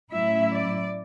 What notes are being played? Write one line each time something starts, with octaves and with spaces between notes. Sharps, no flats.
A2 F#3 C#4 E4 E5
D5